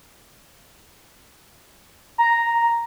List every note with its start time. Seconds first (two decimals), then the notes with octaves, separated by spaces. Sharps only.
2.18 A#5